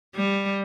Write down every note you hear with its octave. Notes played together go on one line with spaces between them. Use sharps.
G3